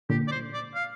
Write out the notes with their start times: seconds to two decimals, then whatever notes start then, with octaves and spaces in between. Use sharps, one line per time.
0.10 A#2 D3 G4
0.27 D5
0.31 C5
0.53 D5
0.75 F5